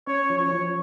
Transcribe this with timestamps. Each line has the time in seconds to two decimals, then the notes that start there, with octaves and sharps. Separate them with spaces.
0.07 C#4 C#5
0.30 F3
0.37 C#5
0.53 F3